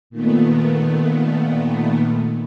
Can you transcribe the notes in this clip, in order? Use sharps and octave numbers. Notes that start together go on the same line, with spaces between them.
A#2 D#3 A3 B3